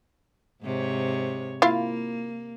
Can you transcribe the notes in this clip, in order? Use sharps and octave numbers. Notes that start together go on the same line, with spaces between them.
G#2 C3 C#5
A#3 E4 F4 F5